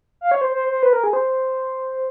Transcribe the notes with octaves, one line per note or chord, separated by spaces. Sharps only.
F5
C#5
C5
C5
C5
B4
A#4
G#4
C5